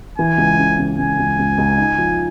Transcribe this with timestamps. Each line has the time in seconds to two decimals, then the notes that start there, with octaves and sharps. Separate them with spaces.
0.18 E3 G#5
0.38 C#2
0.59 C#3
0.79 C#2
0.98 C#2 G#5
1.19 C#2
1.39 C#2
1.58 C#2
1.78 D#4
1.98 F3